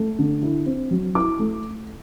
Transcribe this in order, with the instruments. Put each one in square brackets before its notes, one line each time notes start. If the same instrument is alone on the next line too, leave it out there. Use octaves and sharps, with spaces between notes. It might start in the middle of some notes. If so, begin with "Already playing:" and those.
Already playing: [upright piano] A3
D3
E4
C4
F#3
E4 D6
A3